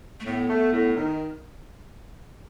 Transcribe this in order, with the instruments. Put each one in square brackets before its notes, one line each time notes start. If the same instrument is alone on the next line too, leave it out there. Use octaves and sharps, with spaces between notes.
[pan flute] A3
[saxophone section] A2 [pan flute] B3
[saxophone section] A3
A2
D#3